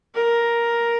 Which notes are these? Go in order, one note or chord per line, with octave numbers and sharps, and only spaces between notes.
A#4